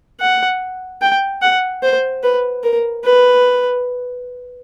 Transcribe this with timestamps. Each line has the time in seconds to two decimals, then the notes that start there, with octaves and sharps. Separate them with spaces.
0.20 F#5
1.02 G5
1.42 F#5
1.83 C5
2.23 B4
2.64 A#4
3.04 B4